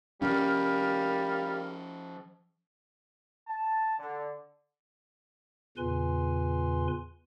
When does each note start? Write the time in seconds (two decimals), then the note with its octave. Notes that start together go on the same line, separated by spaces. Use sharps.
0.22 F3 G3 C#4 A#4 F5
3.47 A5
3.99 D3
5.77 E2 A#2 C#3 B4 G#5 C6